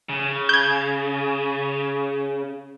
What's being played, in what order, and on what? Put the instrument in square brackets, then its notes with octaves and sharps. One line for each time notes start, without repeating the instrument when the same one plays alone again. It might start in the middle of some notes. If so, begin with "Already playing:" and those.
[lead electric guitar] C#3
[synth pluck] G6 G#6